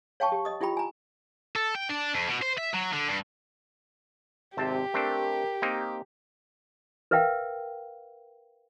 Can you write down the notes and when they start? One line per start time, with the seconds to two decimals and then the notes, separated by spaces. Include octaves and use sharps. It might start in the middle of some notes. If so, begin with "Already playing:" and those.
0.20 C#5 F5 G5 A5 C#6
0.32 G4
0.45 D#5 D#6
0.61 E4 F4 G4 G5 B5
0.77 G#5 A#5
1.56 A4
1.75 G5
1.89 D4
2.14 F2
2.28 B2
2.42 C5
2.58 E5
2.74 F#3
2.93 D3
3.09 G2
4.57 G#1 C3 C4 G4 A5
4.94 A3 C4 D4 A#4
5.62 A#3 C4 D#4
7.11 A#4 B4 E5 F5 G5